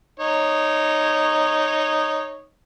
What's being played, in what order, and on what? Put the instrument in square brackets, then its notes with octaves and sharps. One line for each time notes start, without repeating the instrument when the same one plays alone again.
[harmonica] D#4 C#5